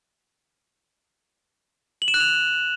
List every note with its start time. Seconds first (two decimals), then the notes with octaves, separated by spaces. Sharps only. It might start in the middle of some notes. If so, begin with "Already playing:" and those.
2.02 F#7
2.08 E7
2.14 F#6
2.20 F7